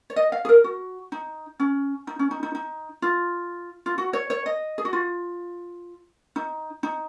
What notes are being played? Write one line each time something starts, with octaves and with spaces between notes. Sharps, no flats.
C#5
D#5
F5
G#4
A#4
F#4
D#4
C#4
D#4
C#4
D#4
D#4
D#4
F4
F4
F#4
C#5
C#5
D#5
G#4
F#4
F4
D#4
D#4